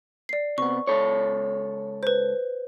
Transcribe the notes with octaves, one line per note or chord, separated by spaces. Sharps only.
D5 C7
C3 B3 C#6
C#2 A4 C#5
B4 C5